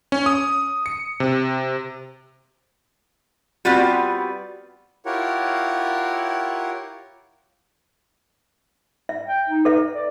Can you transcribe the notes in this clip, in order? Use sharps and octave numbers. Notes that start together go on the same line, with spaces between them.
C#4
D#6
C#7
C3
G3 B3 C4 F4 F#4
E4 F4 G4 A#4 C#5 F#5
E5
G5
D#4
A4 B4 E5
D5